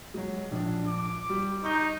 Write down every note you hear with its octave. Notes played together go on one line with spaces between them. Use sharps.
F#3 G#3
A#1 D4
D6
G3
D#4 C#6 G6